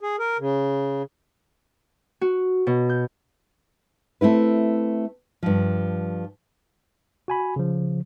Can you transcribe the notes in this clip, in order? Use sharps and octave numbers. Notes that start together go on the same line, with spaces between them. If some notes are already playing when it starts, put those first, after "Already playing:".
G#4
A#4
C#3
F#4
B2
G6
A3 C4 E4 B4
G2 F3
F#4 G#5 B5
C#3 F3